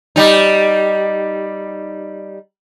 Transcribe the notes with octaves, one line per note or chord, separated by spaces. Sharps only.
G3 D#4